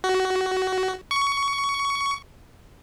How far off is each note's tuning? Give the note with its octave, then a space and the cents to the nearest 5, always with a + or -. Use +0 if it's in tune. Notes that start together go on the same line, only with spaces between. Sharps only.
F#4 +20
C#6 +15